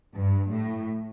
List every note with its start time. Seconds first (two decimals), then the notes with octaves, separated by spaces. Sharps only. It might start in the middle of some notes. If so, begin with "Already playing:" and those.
0.14 G2
0.50 A2